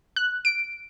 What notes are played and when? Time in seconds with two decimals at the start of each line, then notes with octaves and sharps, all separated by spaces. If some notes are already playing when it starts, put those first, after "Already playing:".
0.16 F#6
0.45 D7